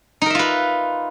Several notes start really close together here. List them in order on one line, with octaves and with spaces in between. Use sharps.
D#4 A#4 E5 F4 B4